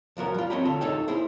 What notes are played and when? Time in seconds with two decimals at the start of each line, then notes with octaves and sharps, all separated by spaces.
0.17 C#2 F3 F#3 A#4
0.34 G3 F4
0.50 C4 C#5 D#5 G5 B5
0.65 D2 F4 A4
0.81 D#4 A4 C#5 G5
1.08 E4 G#4 C5